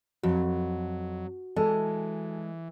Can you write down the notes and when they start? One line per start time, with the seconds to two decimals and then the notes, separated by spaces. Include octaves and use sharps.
0.23 F2 F#3 F#4
1.56 E3 G#3 A4